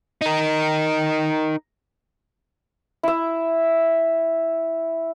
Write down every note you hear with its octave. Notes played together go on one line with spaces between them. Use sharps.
D#4 A#4
E4 E5